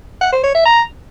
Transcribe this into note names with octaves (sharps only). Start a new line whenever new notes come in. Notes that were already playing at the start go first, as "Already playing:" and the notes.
F#5
C5
C#5
E5
A#5